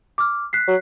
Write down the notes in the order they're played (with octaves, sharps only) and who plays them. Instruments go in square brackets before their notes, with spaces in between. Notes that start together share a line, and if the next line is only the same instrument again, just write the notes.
[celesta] D6 F6
F#6 B6 C7
[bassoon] F#3